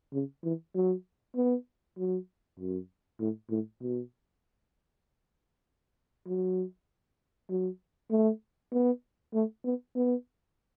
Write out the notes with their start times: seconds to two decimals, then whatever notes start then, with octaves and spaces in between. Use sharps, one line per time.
0.13 C#3
0.44 E3
0.75 F#3
1.36 B3
1.98 F#3
2.59 F#2
3.20 A2
3.50 A2
3.82 B2
6.27 F#3
7.50 F#3
8.11 A3
8.73 B3
9.34 A3
9.65 B3
9.96 B3